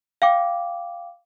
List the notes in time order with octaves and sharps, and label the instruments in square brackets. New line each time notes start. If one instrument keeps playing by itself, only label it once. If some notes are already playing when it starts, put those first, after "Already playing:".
[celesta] F5 G5 D6